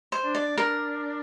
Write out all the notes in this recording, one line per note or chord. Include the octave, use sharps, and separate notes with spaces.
C5
D4
D5
D4 A#4